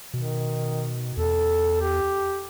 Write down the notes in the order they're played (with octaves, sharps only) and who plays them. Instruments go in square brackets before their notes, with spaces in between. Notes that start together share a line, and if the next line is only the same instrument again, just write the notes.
[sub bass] B2 [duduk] D#3
[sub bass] E2 [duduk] A4
[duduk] G4